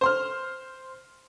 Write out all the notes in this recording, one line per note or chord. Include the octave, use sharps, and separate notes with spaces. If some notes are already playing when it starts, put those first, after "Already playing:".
C5 C6 F6